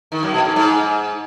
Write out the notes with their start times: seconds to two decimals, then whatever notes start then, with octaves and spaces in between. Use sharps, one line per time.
0.12 D#3
0.23 F#2
0.34 B2
0.45 G#2
0.56 G#2